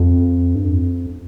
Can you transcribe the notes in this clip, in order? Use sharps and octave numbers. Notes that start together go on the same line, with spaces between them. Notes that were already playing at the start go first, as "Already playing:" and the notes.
Already playing: F2
G2
F2